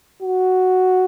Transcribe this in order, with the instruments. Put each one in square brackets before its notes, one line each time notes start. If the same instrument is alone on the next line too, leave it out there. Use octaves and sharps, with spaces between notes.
[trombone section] F#4